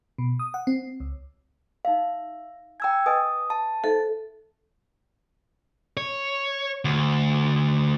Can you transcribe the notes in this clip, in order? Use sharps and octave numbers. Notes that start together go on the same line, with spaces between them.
B2
D#6
F#5
C4
C#2
D#4 E5 F5
G5 G#5 A#5 E6 G#6
B4 D#5 G#5 D#6
A5
D#4 A4 C5 E5
C#5
D2